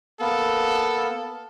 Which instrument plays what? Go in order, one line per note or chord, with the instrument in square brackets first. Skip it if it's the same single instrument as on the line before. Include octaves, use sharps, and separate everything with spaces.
[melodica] A#3 B3 [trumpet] A4